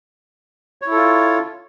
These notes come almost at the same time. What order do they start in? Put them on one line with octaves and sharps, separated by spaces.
C#5 E4 A4 F4